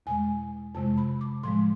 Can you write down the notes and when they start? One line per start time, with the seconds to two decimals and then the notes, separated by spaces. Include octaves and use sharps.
0.06 E2 B2 G#3 G#5
0.75 F2 C3 G#3 A5
0.97 B5
1.21 D6
1.43 A2 F3 G#3 C6